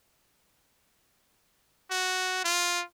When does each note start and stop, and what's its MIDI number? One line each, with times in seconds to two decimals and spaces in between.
1.91 2.43 66
2.45 2.84 65